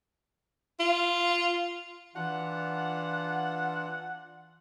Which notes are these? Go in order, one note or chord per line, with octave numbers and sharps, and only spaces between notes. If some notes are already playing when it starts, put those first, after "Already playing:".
F4
E3 D4 F4 F#5